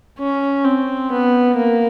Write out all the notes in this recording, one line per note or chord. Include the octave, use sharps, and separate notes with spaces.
C#4
C4
B3
A#3